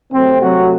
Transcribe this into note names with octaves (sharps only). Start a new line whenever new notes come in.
C3 F#3 A3 C4
F#3 F#4